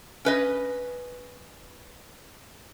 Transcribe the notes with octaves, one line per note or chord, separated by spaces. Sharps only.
C#4 B4 D#5